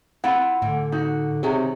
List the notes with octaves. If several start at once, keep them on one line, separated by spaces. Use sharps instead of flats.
C4 E4 F4 F#5
A2 D3 E3
D#4 F#4
C3 D#3 F#3 C4 G4 G#4